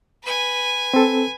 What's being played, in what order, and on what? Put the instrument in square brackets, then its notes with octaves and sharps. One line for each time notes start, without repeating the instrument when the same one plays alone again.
[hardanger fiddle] B4 G#5
[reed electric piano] C4 A4